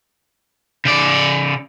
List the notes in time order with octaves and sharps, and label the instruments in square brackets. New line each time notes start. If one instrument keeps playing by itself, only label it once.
[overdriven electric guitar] C#3 D5